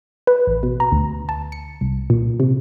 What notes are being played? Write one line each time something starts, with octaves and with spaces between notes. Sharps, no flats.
B4
A1
B2
A#5
D2
A5
C#7
C2
A#2
C3